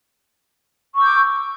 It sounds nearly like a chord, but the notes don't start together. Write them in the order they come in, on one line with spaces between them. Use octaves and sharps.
C#6 E6 G6 D6